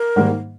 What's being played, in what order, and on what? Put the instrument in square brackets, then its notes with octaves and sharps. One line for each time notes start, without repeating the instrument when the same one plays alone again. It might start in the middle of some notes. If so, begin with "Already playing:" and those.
Already playing: [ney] A#4
[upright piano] G#2 D#3 G3 A#3